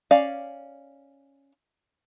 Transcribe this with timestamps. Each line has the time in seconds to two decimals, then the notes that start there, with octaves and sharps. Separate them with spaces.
0.11 C#4 D5 F5